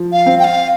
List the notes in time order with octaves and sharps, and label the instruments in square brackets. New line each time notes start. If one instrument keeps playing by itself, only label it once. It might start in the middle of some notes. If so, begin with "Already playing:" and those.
Already playing: [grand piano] F3
[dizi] F5
[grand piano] C4
[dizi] G5
F5